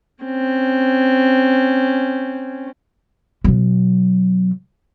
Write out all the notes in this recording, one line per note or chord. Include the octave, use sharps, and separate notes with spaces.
C4 C#4
B2 F#3